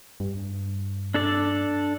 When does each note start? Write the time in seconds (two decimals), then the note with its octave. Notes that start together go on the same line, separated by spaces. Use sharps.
0.20 G2
1.14 D4 A4 D5